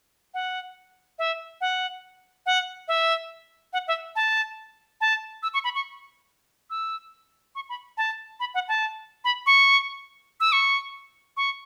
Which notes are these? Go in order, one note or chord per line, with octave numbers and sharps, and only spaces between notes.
F#5
E5
F#5
F#5
E5
F#5
E5
A5
A5
E6
C#6
B5
C#6
E6
C#6
B5
A5
B5
F#5
A5
B5
C#6
E6
C#6
C#6